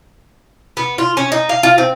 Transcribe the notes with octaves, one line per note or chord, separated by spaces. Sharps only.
B3
F4
C#4
D#4
F5
F4
C4